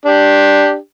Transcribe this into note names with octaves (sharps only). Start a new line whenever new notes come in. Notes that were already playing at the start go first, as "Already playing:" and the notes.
D4 G4